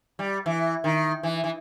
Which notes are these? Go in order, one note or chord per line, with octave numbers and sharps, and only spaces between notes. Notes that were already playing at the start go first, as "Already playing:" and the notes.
G3
E3
D#3
E3
E3